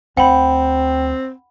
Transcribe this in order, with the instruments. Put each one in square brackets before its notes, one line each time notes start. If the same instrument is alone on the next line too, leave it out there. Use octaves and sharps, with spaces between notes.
[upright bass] D2 [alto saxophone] C4 [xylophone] F#5 B5 [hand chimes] G5